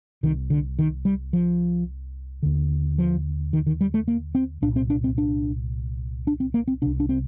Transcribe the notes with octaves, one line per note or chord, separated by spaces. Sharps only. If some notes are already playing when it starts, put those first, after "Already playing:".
C2 C3 D#3
D3
D#3
G3
F3
D#2 D3
F3
D#3
D#3
G3
A3
A#3
C4
C2 A#2 D4
C4
D4
C4
D4
D4
C4
A#3
C4
C2 C3 D4
D4
C4